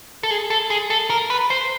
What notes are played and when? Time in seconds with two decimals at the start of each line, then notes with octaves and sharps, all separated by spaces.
0.23 A4
0.31 G#4
0.50 A4
0.70 G#4
0.90 A4
1.10 A#4
1.30 B4
1.50 C5